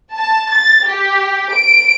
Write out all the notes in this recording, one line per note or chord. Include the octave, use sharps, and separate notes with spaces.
A5
A6
G4
D7